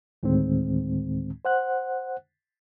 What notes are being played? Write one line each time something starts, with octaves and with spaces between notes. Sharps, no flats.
D2 A2 D#3 G#3 C4
C5 F#5 F#6